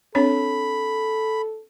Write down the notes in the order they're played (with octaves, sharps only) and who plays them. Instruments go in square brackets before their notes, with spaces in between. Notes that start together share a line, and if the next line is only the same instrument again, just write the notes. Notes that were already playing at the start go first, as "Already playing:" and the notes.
[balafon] C4 D4 C#5 [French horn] A4 [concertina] B5